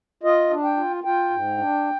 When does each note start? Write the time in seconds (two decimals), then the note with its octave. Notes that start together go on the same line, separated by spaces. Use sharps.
0.23 F4 D#5
0.50 D4
0.64 G5
0.77 F4
1.04 F4 G5
1.30 G#2
1.58 D4